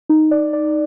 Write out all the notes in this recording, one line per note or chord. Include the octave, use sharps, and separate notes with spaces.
D#4
D5
D5